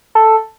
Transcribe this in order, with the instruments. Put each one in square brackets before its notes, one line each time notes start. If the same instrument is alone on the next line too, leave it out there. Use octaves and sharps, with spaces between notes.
[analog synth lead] A4